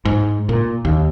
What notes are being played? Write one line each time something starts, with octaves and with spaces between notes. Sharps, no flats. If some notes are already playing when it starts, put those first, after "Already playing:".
G#2
A#2
D#2